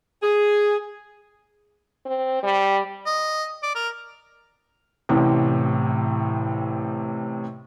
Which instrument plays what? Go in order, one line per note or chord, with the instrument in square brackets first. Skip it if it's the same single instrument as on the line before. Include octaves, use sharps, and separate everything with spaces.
[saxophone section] G#4
[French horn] C4
G3
[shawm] D#5
D5
A#4
[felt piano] A1 A2 C3